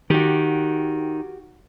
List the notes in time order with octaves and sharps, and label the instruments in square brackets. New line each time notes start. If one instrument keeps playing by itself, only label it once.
[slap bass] D#3 [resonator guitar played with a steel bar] F#4 G4